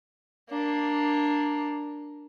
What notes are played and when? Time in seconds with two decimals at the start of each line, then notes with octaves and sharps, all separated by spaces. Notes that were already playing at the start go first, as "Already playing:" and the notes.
0.49 A#3 D4